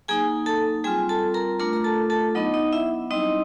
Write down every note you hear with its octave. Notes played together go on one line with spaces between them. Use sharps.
F#3 A#3 D#4 G#4 G#5
A4 A5
G3 C4 F4 G#4 G#5
A4 A5
A#4 A#5
A3 D4 F4 A#4 A#5
A#5
A4 A5
A4 A5
F#3 B3 D4 D#4 D#5
D#4 D#5
E4 E5
G3 C4 D#4 E4 D#5